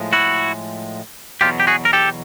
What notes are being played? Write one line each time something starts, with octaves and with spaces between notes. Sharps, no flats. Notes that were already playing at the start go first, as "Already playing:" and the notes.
Already playing: A2 F3 G#3
E4 F#4
E2 B2 F#3 F4 G4
G4
F#4 G#4
A#4
G4 A4